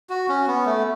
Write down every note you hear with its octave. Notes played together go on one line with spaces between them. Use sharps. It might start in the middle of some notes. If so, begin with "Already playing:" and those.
F#4
C#4
B3
A3